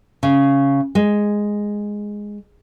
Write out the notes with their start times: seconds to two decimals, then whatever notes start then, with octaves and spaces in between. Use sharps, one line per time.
0.23 C#3
0.95 G#3